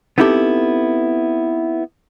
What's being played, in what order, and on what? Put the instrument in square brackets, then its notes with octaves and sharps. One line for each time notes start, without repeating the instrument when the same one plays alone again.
[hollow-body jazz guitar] B3 C4 D#4 E4 G4 A4